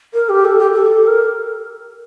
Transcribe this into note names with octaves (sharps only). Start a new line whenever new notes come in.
A#4
G4
A4
G4
A4
A#4